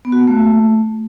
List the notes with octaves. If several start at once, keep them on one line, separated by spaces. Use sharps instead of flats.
B3
F#4
A#3
A3